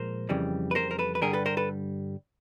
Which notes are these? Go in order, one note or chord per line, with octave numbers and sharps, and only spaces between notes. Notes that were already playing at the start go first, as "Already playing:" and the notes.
Already playing: A#2 F3 G#3 A#4 C5
F2 C#3 E3 G3
B4
A#4 C5
A#4
A4 B4
B4
G2 D3 G3 G#4 A#4
A4 B4
A#4 C5
A4 B4